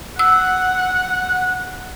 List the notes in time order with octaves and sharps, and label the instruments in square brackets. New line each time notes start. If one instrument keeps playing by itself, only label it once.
[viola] F#5 [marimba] E6